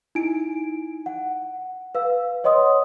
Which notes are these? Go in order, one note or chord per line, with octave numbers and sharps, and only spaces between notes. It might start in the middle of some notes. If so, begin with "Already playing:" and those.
D#4 E4 G#5 D7
F#5
B4 F5 E6
B4 C#5 D#5 F#5 C6 D#6